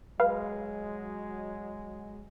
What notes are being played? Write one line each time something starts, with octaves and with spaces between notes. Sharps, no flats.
F#3 G#3 B4 F5